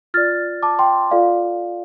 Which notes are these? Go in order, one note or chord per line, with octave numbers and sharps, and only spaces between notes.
F4 D5 F6 A6
A5 D6
G5 C6
F4 A4 D5 F5